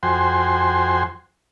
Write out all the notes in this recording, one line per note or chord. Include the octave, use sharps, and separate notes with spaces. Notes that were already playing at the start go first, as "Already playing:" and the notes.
F2 F#4 C5 G5 G#5 C6